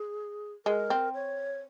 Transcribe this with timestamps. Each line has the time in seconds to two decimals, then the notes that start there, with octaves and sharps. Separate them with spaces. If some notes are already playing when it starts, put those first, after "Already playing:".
Already playing: G#4
0.66 G#3 A#4
0.90 C4
1.14 C#5